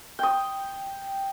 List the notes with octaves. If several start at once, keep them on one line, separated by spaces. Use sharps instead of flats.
G5 D#6